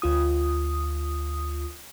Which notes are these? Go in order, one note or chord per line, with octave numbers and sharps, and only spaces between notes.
D2 F4 D#6